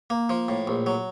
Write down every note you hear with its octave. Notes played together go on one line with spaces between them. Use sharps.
A#3
F3
A2
A#1
F#3